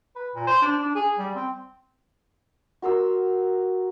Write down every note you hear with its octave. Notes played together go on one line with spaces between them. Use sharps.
B4
A#2
C5
D4
D4
G#4
G3
C4
F#4 A#4 C6 E6